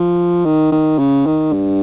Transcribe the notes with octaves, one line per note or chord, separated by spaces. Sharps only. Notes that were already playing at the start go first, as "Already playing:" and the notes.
Already playing: F3
D#3
D#3
C#3
D#3
G2